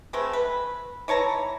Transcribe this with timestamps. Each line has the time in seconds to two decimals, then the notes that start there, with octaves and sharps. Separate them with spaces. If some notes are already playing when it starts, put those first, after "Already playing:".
0.13 G#3 A3 C4 B4
0.33 B4
1.08 E3 C#5 A5 A#5